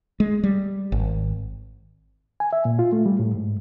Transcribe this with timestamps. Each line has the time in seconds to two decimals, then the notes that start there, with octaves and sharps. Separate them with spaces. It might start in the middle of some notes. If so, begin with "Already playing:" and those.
0.20 G#3
0.44 G3
0.92 G#1
2.40 G#5
2.53 E5
2.65 A#2
2.79 F4
2.92 A3
3.06 G3
3.19 A2
3.35 G#2